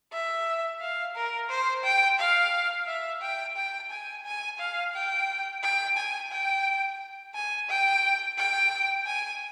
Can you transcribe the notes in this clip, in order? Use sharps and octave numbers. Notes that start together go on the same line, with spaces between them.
E5
F5
A#4
C5
G5
F5
E5
G5
G5
G#5
G#5
F5
G5
G5
G#5
G5
G#5
G5
G5
G#5